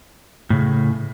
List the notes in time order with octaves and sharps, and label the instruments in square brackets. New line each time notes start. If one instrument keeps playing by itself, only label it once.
[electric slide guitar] A2 C#3